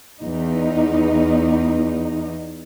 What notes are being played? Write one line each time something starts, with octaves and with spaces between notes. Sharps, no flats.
E2 D#4